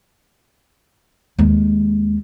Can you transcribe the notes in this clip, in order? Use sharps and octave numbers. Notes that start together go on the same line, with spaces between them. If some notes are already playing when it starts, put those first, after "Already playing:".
D#2 G#3